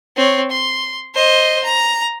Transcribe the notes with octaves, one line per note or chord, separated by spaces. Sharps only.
C4 C#5
C6
C5 D#5
A#5